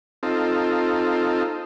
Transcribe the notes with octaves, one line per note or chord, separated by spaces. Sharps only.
C4 D#4 F4 A4